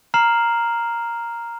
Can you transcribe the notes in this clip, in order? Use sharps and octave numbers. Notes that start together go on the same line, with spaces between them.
A#5 F6 C7 E7 F#7